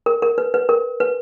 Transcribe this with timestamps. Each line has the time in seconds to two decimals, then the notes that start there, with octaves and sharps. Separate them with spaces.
0.06 A#4
0.22 A#4
0.38 B4
0.54 B4
0.69 A#4
1.00 B4